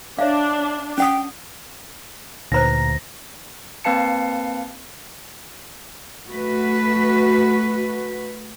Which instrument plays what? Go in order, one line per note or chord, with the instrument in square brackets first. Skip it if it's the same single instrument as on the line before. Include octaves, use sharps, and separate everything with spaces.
[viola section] D4 [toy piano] C#5 E5 F5
[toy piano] C#4 F#5 D#6 [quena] G5
[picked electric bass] D2 [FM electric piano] A#2 A#5 [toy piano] D#4 B4 C5 [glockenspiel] A#6
[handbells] A#3 C4 B4 F5 A5 C#7
[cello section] A3 F#4 B4